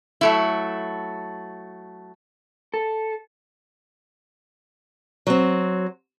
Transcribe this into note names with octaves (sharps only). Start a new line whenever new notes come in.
F#3 A3 E4
A4
F#3 C4